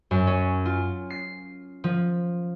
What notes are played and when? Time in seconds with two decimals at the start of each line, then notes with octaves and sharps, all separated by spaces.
0.11 F#2
0.27 C#4
0.65 F4
1.10 C7
1.84 F3